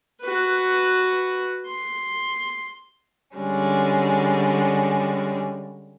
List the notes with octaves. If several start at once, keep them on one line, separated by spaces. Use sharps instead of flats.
F#4 B4
C6
D3 G3 G#3 C#4